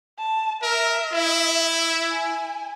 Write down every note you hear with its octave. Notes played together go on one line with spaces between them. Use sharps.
A5
A#4 E5
E4
G#5